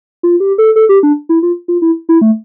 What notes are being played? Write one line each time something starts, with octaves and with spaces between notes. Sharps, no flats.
F4
G4
A4
A4
G4
D4
E4
F4
F4
E4
E4
A3